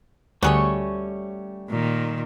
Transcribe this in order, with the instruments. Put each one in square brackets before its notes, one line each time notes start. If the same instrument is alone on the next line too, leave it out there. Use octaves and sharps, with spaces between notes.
[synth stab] D2 [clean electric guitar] G3 A3 C#4 [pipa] F#4 G#4 C#5
[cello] A#2 D#3